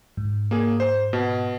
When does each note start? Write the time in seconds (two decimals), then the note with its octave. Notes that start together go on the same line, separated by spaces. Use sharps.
0.17 G#2
0.51 A#3 G#4
0.80 C5
1.13 B2